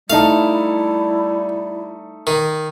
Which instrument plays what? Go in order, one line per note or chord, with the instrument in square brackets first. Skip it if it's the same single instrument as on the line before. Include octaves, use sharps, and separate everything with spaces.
[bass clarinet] G3 [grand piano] A3 D#4 A5 [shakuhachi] E4 [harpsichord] F5
[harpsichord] D#3